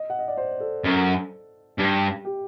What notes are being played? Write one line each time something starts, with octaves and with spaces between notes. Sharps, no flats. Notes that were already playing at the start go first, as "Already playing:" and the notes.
Already playing: D#5
F#5
D#5
D5
C5
A4
F#2
G2 G4
G4